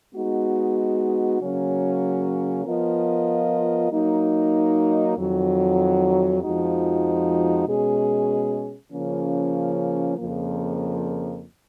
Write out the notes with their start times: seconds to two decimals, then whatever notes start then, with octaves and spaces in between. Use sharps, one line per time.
0.14 G#3 B3 D#4 F#4
1.40 C#3 F#3 A#3 C#4
2.65 F3 B3 F4 A#4 D#5
3.91 F#3 A#3 D#4
5.16 F2 D#3 F#3
6.42 F2 F3 G#3 D#4 F#4
7.67 B2 G#3 C#4 G#4
8.92 C#3 F3 A#3 C#4
10.18 F2 C#3 F3 A#3